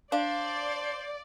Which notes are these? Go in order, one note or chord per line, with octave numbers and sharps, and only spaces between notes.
D4 C5 D5 F5